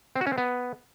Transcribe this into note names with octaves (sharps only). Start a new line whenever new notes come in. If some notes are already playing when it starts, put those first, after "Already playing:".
C4
F#4
C#4
C4
B3